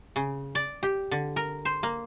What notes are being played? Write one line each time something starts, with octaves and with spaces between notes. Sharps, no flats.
C#3
D5
G4
D3
A#4
C5
A#3